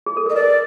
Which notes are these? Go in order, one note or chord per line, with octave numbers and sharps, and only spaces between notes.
G#4
A4
A#4 D#5
B4 D5